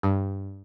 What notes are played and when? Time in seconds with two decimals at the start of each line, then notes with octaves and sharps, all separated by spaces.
0.03 G2